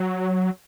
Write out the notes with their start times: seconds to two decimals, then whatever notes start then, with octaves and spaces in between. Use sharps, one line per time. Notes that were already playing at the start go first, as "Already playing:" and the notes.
Already playing: F#3